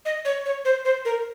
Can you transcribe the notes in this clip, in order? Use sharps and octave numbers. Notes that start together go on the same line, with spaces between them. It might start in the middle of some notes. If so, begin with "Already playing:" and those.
D#5
C#5
C#5
C5
C5
A#4